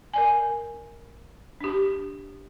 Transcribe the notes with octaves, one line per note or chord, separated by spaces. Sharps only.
A#4 D5 G#5
D4 G4